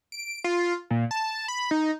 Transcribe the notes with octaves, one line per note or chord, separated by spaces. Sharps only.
D7
F4
A#2
A5
B5
D#4